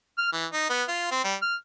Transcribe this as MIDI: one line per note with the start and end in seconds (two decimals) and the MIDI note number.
0.18 0.30 89
0.33 0.45 52
0.53 0.65 63
0.70 0.83 59
0.88 1.09 65
1.11 1.20 60
1.24 1.35 55
1.42 1.55 89